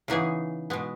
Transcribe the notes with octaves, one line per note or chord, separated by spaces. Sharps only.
C#3 E3 B3 D#4 G#4
B2 G#3 B3